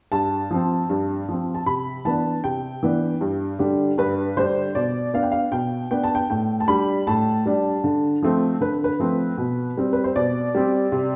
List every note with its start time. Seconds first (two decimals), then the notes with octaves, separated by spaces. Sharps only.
0.12 G2 A5
0.51 F3 C4
0.90 G2
1.29 F3 C4
1.55 A5
1.66 C3 B5
2.05 E3 B3 D4 A5
2.44 C3 G5
2.83 E3 B3 D4
3.21 G2
3.59 D3 G3 D4
3.98 G2 B4
4.37 D3 G3 D4 C5
4.75 B2 D5
5.14 B3 D4 F5
5.23 G5
5.32 F5
5.52 B2 G5
5.91 B3 D4 G5
6.03 A5
6.15 G5
6.30 A2 G5
6.60 A5
6.68 G3 D4 B5
7.07 A2 A5
7.46 G3 D4
7.84 D3
8.22 F3 A3 C4
8.60 D3 B4
8.84 B4
9.00 F3 A3 C4
9.38 B2
9.77 G3 C4
9.93 B4
10.04 C5
10.16 B2 D5
10.55 G3 C4
10.92 C3